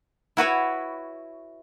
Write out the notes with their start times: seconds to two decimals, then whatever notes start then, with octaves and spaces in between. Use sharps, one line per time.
0.37 E4 F#4 B4 C#5